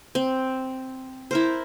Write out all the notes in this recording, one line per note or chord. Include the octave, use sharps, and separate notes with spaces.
C4
E4 A#4 C5